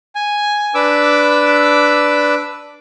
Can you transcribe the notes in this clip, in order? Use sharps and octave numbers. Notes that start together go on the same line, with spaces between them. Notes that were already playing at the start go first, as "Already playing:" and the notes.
G#5
D4 B4 D6 E6